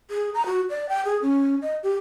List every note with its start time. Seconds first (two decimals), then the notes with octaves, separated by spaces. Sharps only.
0.11 G#4
0.34 A#5
0.46 F#4
0.70 D5
0.89 G5
1.05 G#4
1.22 C#4
1.62 D#5
1.83 G4